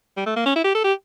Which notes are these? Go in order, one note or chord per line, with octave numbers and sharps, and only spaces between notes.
G3
A3
A#3
C#4
E4
G4
A4
G4